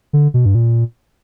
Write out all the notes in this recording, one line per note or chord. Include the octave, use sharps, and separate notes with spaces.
D3
B2
G2
A#2